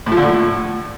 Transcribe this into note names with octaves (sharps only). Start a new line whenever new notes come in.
A2
F3
D3
A2